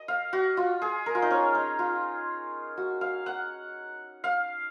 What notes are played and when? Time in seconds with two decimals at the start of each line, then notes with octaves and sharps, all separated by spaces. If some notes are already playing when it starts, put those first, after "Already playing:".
Already playing: D#5
0.08 F5
0.33 F#4
0.57 F4
0.82 G#4
1.06 A#4
1.15 F4
1.22 D#4
1.31 C#4
1.55 D#4
1.79 F4
2.77 F#4
3.01 F5
3.26 F#5
4.24 F5